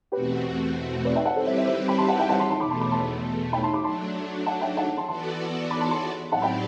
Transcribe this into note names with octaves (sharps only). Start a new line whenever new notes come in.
E2 B2 A3 C4 F#4 G4 B4
B4 D5
E5 G5
F#5 A5
G3 C4 E4 G4 A4 B4 C5
C5 E5
C5 E5
C5 E5
G5 B5
A5 C6
F#5 A5
E5 G5
F#5 A5
A5 C6
A5 C6
E2 B2 A3 B5 D6
A5 C6
B5 D6
A5 C6
G5 B5
A5 C6
B5 D6
F#3 A3 D4 A5 C6
F#5 A5
E5 G5
F#5 A5
A5 C6
E3 B3 F#4 A4 D5 A5 C6
B5 D6
A5 C6
A5 C6
A2 F#3 C4 G4 D5 F#5 A5
G5 B5